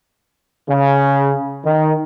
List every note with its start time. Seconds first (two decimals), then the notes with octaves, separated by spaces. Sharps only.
0.69 C#3
1.65 D#3